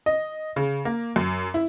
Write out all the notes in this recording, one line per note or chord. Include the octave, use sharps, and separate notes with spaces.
D#5
C#3
A#3
F#2
E4